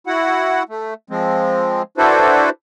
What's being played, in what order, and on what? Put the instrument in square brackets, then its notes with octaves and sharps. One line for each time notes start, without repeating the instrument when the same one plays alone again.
[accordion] E4 F#4 F#5
A3
F3 G#3 C4
D4 E4 F#4 A4 B4 C5